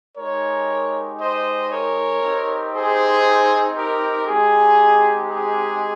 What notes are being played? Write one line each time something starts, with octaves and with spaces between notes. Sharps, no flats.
G#3 D#4 G4 A#4 C#5
C5 D#5
A#4 C#5
C4 D#4 G4
G#4 C5
G4 A#4
G#3 C4 D#4 G4 G#4
G#4